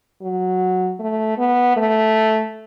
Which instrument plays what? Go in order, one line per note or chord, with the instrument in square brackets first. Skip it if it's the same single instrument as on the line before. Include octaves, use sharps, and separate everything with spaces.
[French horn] F#3
A3
B3
A3